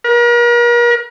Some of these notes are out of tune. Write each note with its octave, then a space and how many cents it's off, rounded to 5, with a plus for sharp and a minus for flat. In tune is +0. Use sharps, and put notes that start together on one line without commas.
A#4 +40